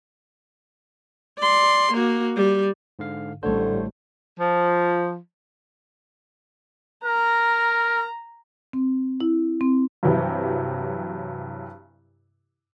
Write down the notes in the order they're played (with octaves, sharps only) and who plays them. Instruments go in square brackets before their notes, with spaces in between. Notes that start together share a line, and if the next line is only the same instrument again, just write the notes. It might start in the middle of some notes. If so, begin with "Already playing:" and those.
[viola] D5 C6
A#3 F#4
G3
[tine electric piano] G#2 D3 F5
[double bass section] A1 G3 A3 [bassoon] D3 [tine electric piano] C5 C#5
[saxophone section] F3
[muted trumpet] A#4 [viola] A#5
[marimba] C4
E4
C4
[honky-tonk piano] G2 C3 E3 F#3 E4 G4